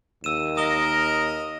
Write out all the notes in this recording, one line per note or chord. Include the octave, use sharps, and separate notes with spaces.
D#2 E6 D#7 E7
A#4 D#5 D#6 E7 G7